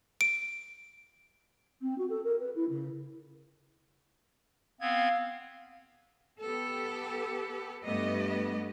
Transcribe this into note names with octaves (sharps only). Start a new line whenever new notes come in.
D7
C4
F#4
A4
A#4
B4
E4
C#3
B3 C4 F5 G#6
B3 G4 A4
G2 A3 B3 G4 D#5